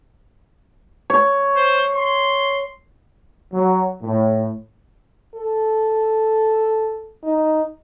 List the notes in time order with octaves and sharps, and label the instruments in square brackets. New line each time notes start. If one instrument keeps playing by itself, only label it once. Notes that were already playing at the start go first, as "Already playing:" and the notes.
[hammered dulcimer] C#5
[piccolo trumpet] C5
C6
[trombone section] F#3
A2
[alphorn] A4
D#4